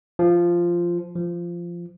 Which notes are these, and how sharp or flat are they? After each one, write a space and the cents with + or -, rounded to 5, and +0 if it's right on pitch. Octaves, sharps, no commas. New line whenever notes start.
F3 -10
F3 -15